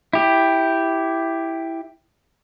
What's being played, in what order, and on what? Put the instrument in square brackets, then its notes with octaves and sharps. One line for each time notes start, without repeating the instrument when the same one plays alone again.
[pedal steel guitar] E4 G4